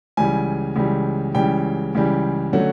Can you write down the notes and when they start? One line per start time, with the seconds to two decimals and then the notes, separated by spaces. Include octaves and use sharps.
0.17 C#2 C#3 E3 G3 G#5
0.76 C#2 C#3 E3 G3
1.34 C#2 C#3 E3 G3 G5
1.95 C#2 C#3 E3 G3
2.53 D3 F#3 A3 C#4 F#5